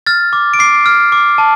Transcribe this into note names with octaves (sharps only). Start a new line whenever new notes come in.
F6 A6
D6
D7
D6 C7
F6
D6
A5